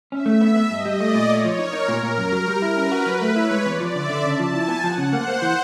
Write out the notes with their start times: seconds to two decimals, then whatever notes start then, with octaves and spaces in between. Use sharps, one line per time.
0.12 C#4 E5
0.26 A3
0.41 B3
0.56 B3
0.70 G2 D#5
0.85 G3
1.00 A3 D5
1.15 A#2
1.29 A3 C#5
1.45 F3
1.59 D#4 A#4
1.73 D#4
1.88 A#2 A#4
2.03 A#2
2.18 F#2
2.32 F#3
2.48 G3
2.62 E4
2.76 C#4 B4
2.92 F#4
3.06 F#3
3.21 A3
3.36 E4 C#5
3.51 G#3
3.65 E2 D5
3.80 F3
3.94 D3 E5
4.09 D3
4.24 C#3 A5
4.39 F3
4.54 E4 G#5
4.68 B3
4.83 F3 F#5
4.98 C#3
5.13 A#3 C5
5.28 A#3
5.42 E3